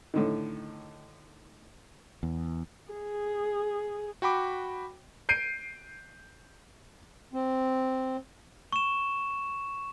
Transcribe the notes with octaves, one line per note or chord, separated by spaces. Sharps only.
A2 D3 D#3
E2
G#4
F#4 G5 B5 D6
G6 C7 D7 D#7
C4
C#6 E7